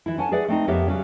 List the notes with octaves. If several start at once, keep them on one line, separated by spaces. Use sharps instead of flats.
E3 E4
C#4 A4 F#5 G#5 A5
G#4 B4 D5 E5 F#5
A3 C4 D#4
F2 B3 G4 A#4 C#5 E5
C#3 F#3 G3 C#4